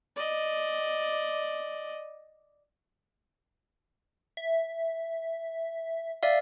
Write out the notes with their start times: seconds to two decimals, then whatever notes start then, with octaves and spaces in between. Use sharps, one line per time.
0.16 D5 D#5
4.37 E5
6.23 D5 E5 F5